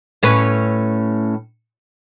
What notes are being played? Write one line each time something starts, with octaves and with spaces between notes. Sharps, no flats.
A2 C#4 B4